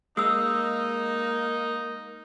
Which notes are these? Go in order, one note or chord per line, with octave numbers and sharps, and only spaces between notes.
G#3 A#3 D#4 D#6 E6